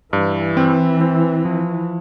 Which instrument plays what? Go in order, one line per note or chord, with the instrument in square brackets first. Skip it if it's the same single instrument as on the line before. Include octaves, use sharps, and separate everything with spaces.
[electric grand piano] G2 [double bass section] E3
[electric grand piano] C4
C4
F3